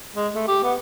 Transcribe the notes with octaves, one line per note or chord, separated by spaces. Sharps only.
G#3
A3
G4
B3